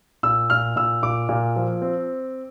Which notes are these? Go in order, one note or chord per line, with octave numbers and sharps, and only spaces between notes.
A#2 E6
A#2 F6
A#2 E6
A#2 D6
A#2
F3
C4